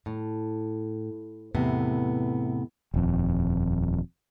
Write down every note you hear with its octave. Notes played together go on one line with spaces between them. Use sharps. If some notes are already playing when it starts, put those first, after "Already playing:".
A2
E2 A2 C3 B3
D#1 F2